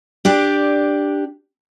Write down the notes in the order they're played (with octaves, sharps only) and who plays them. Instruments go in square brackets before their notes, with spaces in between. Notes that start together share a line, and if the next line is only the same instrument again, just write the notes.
[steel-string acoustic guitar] D4 G4 D5